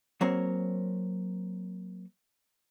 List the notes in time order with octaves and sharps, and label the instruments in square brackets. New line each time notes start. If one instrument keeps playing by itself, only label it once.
[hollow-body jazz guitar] F#3 A#3 C4 A#4 C5 C#5